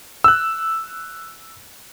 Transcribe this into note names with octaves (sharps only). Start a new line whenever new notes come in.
E6 F#6